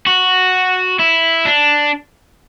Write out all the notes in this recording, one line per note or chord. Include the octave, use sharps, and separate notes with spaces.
F#4
E4
D4